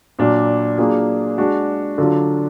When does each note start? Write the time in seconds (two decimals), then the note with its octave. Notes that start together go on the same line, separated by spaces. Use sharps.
0.19 A#2 F#3 D4
0.78 F#3 A#3 D4 F4 G#4
1.38 G#3 D4 F#4
1.98 D3 F#3 D4 F4